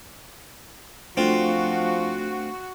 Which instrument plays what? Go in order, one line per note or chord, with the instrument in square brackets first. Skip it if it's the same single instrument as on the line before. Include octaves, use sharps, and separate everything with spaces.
[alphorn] F3 [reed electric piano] A3 D4 [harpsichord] C4 F4 [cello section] F#4